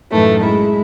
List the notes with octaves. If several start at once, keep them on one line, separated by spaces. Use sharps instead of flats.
F#2 A2 D#3 E3 A3
G#3 E4